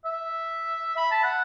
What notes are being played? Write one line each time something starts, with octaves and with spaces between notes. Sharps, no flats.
E5
B5
A5
F#5